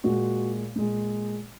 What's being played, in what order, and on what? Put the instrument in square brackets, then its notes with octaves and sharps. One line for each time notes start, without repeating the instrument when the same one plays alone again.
[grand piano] A#2 G#3 F#4
A#2 G#3